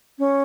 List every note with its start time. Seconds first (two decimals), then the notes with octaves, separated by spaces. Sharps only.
0.18 C#4